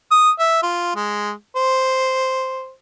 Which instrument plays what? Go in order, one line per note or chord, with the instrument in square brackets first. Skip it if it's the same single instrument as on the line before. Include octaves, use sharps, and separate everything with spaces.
[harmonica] D#6
E5
F4
G#3
C5